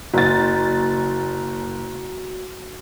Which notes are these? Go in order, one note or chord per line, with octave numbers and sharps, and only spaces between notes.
F#1 F#4 A6